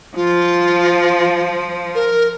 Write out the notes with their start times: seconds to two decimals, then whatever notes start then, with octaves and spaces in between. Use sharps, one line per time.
0.16 F3 F4
1.95 A#4